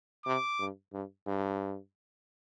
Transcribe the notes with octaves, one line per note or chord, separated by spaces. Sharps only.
C3 D6
G2
G2
G2